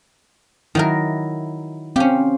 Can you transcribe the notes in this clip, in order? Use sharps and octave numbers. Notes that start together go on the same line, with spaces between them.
D#3 F#3 E4 A#4
C4 C#4 G4 F5